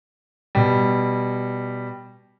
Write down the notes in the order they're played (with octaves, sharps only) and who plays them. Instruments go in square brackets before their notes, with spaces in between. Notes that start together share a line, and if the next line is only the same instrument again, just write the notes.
[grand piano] B2 G3